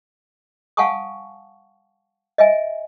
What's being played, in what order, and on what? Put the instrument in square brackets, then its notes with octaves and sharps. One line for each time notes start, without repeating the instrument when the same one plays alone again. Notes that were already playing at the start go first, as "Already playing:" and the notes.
[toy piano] F5 F#5 G#5 A5 C#6 D#6
D#5 E5 G#5